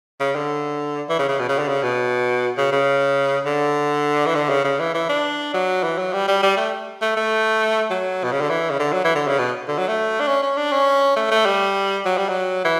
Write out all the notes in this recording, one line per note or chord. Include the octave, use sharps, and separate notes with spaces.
C#3
D3
E3
C#3
C#3
B2
C#3
D3
C#3
B2
C#3
C#3
D3
E3
D3
C#3
C#3
E3
E3
D4
F#3
E3
F#3
G3
G3
G3
A3
A3
A3
F#3
B2
C#3
D3
E3
C#3
D3
F#3
E3
D3
C#3
B2
D3
F#3
A3
D4
C#4
C#4
D4
C#4
A3
A3
G3
F#3
G3
F#3
E3